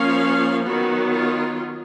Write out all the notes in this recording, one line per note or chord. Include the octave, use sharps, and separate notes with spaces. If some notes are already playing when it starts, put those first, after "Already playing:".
Already playing: F3 A#3 C#4 F5
D#3 F#3 B3 F#4
F4